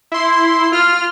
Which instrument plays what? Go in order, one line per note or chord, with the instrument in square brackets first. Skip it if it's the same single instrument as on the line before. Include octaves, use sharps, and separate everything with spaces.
[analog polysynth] E4 C6
[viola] F4 [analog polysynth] F6